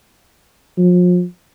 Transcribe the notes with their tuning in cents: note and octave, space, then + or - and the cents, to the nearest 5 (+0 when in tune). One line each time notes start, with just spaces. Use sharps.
F3 +35